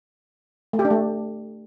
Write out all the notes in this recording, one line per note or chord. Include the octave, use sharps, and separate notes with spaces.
A3
G4
D4
A3